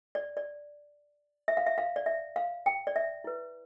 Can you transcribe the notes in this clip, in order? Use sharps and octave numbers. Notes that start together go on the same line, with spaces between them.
D5
D5
E5
F5
E5
F5
D5
E5
F5
G5
D5
E5
E4 B4